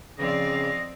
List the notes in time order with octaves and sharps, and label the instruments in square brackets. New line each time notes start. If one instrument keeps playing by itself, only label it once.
[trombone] C#3 [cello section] F3 D5 F5 [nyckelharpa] C4 [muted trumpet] D#5